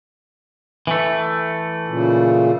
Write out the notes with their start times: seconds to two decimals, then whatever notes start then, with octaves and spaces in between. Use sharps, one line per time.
0.87 E3 A3
1.88 A#2 C#3